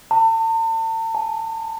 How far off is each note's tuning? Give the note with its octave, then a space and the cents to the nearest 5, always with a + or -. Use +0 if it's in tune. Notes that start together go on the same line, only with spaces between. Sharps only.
A5 +40
A5 -40